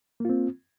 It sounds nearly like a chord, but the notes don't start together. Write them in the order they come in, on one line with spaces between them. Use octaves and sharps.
A#3 F4 C4